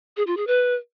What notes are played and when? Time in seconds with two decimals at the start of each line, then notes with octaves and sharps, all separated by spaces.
0.17 G#4
0.27 F4
0.37 G#4
0.47 B4